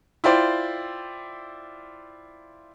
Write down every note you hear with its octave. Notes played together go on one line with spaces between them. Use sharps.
E4 F4 C5 D5 G5 C6